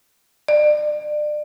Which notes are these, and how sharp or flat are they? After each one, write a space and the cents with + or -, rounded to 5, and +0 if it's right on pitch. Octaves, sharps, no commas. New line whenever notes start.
D5 +30